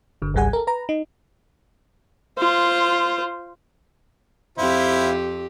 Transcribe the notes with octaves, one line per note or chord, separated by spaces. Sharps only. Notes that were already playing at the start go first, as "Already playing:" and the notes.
G1 D3
G#1 C#2 G3 G#4 F#5 G#5
A4 A#4
B4 A#5
D#4
F4 C5
F2 C4 E4 F4 G4 C5